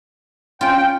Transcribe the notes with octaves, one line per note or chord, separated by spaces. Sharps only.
C#4 F4 G5